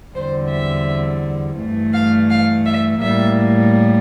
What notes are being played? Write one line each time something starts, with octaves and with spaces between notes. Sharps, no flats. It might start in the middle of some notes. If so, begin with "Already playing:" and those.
E2 D3 G3 C4 C5
E5
G2 E3 A3
F5
F5
E5
A2 G3 A#3 E5